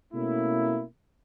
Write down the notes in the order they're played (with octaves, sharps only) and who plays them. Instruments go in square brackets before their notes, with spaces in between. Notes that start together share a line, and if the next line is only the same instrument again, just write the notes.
[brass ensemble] B2 A3 A#3 C#4 E4